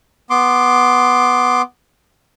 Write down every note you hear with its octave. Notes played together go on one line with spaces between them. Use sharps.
B3 C6 D6